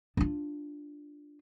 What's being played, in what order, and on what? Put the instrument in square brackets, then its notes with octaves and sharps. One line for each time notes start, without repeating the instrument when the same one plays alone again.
[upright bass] D4 F4